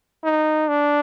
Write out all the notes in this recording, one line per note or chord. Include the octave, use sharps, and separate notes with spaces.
D#4
D4